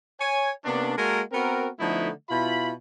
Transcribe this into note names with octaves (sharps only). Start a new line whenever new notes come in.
C#5 G#5
C3 A#3 B3 C#4 D4
G#3 A#3 F#4 A4 A#4
B3 C4 F#4 A#4
D3 F3 A3 B3 D#4 E4
B2 E4 F4 B5